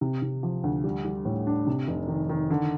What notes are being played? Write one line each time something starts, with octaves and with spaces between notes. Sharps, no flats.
C3
C3
F3
D2
G3
G3
A2
D4
C3
F1
D#3
D#3
D3